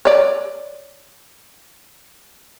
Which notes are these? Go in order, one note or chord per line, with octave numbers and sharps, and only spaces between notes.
C#5 D5